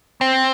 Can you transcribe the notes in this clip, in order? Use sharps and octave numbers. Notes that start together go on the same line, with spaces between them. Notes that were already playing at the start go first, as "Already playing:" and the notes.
C4